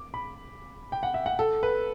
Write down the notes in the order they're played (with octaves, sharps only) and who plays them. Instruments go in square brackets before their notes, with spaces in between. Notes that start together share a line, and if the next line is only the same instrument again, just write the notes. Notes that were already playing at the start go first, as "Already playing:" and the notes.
Already playing: [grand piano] D6
B5
G5
F#5
E5
F#5
A4
B4